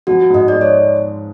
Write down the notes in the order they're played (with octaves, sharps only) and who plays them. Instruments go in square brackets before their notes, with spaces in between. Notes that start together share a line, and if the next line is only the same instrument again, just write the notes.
[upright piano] F3 [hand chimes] F#4
[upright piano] G#2 [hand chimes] D#5
[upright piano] G#3 [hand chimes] D5
[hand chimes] C#5